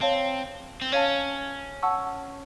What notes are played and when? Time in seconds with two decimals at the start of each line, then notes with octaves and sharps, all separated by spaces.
0.01 C4 C#5 F5 A5
0.81 C4
0.92 C#4 C#5 F5 A5
1.83 F#5 A5 C#6 E6